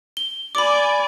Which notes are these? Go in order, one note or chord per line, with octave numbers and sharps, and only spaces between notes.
G7
D5 G#5 B5 D6